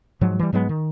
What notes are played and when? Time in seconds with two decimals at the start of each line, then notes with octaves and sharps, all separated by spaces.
0.21 G#2 F3 F#3
0.39 E3 G3
0.53 G#2 F#3 G#3 B3
0.69 D#3